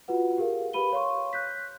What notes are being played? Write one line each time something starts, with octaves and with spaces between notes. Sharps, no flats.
F4 F#4 B4 F#5
G4 G#4 A#4 F5
G4 B4 F5 B5 D#7 G7
C#5 F5 C6 C#6
F#6 G6 B6